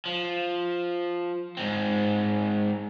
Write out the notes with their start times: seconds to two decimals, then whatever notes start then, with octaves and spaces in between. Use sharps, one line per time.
0.06 F3
1.57 G#2 C4